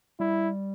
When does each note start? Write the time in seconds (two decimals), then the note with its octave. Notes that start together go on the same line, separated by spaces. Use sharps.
0.20 G3 E4